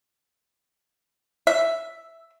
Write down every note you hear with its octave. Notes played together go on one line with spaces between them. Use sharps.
E5